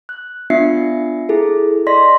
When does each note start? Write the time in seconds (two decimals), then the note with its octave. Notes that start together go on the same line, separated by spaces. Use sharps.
0.09 F#6
0.50 B3 D4 F4 E5 C7 C#7
1.29 E4 G#4 A4
1.87 D5 D#5 C6 A#6 B6